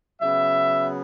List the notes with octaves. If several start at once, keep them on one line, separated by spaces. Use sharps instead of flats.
C#3 F#3 B3 E5